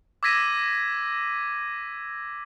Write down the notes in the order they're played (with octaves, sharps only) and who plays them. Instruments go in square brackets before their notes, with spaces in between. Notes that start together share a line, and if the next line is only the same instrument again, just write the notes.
[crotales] D6 E6 G#6 A#6 B6 D#7